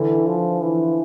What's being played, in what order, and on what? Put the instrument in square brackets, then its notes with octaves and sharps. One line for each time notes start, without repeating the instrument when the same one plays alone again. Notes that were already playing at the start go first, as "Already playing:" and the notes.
Already playing: [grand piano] D3 [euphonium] E3
[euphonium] F3
E3